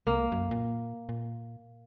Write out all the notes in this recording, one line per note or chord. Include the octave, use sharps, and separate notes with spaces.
C2 A#3
F#2
A#2
A#2